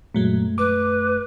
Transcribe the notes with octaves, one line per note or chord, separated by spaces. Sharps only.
F#2 A#2 F#3 G#3 A3
B4 D6